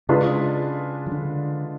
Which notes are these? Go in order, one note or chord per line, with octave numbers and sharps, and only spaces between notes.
C#3 G#3 D4 F4 G#4 B4
F3
D3